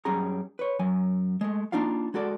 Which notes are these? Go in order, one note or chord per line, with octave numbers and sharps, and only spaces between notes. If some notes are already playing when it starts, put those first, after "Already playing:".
F#2 G3 C#4 G#4 A#5
B4 C#5
F#2 F#3 G#5
G#3 A3
A#3 D4 D#4 F4 F5
G#3 F#4 A4 D5